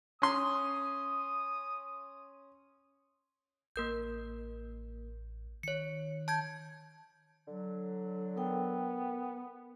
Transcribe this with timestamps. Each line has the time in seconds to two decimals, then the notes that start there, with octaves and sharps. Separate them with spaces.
0.22 C#4 C6 D#6
3.76 A1 A#3 A#4 G6
5.63 D#3 C#5 C#7
6.28 A5 G6 G#6
7.48 D3 F#3
8.37 B3 A#4 G5